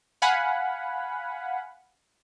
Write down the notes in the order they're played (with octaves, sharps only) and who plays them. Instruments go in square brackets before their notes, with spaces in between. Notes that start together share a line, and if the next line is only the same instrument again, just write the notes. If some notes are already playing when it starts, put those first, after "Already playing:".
[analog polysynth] F5 F#5 G#5 B5